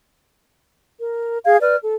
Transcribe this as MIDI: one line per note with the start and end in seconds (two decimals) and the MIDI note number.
0.99 1.38 70
1.45 1.59 68
1.45 1.59 77
1.45 1.59 92
1.60 1.76 71
1.60 1.76 74
1.60 1.76 89
1.82 1.95 69